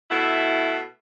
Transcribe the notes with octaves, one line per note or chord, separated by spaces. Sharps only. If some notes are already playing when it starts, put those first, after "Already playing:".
B2 A3 E4